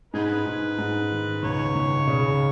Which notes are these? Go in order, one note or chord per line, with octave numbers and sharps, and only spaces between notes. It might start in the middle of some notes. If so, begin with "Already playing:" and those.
G#2 D#4 G#4 B4
G#2
G#2
D#3
C#2 C#5
C#2
C#3